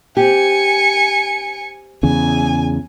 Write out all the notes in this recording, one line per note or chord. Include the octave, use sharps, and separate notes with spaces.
C4 G4 G#5 C#7
E2 C#3 G#5